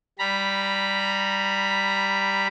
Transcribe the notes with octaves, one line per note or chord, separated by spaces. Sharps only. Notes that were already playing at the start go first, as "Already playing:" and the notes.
G3 A#5 B5